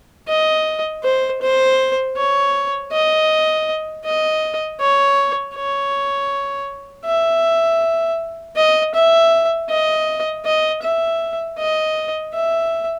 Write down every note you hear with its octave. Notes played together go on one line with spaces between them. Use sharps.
D#5
C5
C5
C#5
D#5
D#5
C#5
C#5
E5
D#5
E5
D#5
D#5
E5
D#5
E5